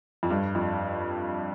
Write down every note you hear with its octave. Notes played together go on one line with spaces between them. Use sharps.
F2
G2
F2